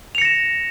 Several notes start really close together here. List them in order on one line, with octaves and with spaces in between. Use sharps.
F7 C#7 A#6 E7